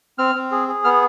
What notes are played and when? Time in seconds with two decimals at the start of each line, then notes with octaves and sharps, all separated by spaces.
0.18 C4 F6
0.35 C4
0.51 G#4
0.68 G#4
0.84 B3 F6